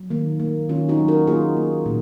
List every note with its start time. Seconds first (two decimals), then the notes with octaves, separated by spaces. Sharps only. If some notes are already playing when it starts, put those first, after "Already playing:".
Already playing: F#3
0.10 D#3 A#3
0.40 A#3
0.69 D#3 C#4 F4
0.89 D#4 F#4
0.98 F#3
1.08 F#4 A#4
1.27 A#3 F4 G#4
1.57 A#3
1.86 A#2